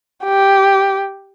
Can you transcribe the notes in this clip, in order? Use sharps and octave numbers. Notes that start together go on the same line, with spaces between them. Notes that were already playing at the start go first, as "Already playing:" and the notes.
G4